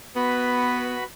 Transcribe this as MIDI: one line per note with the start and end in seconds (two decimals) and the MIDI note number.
0.16 0.98 59
0.16 1.04 66
0.16 1.04 71
0.16 1.04 83